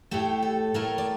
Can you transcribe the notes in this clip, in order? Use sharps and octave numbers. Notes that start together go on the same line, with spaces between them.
A2 A3 G4
A4
A2 A3 A#4
D5